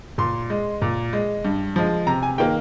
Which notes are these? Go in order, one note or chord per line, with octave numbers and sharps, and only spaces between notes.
A#2 C6
G#3
A#2
G#3
G2
F3 G#3
C3 A#5
G#5
D#3 A#3 G5